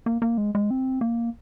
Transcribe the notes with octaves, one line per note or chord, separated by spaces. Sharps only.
A#3
A#3
G#3
G#3
C4
A#3